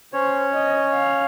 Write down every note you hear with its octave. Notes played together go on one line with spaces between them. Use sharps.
C#4 C5 C#5
D#5
F5